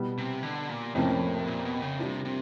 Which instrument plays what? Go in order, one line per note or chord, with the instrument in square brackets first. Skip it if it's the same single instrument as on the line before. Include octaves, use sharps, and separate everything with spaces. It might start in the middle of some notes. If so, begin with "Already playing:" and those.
Already playing: [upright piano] B2 G3 B3
[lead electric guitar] C3
D3
A#2
[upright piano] F2 C3 F3 A#3 C#4 [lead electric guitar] A2
[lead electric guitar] A#2
B2
C#3
[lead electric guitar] C3 [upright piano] G3 A#3 D4 F4
[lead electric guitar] C3